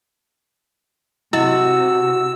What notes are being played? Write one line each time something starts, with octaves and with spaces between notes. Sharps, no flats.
C3 E4 F#4 D#5 E6